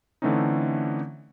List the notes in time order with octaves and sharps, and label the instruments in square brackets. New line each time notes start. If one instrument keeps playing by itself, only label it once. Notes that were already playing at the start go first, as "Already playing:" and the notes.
[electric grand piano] D3 E3 A3 C4 C#4 D#4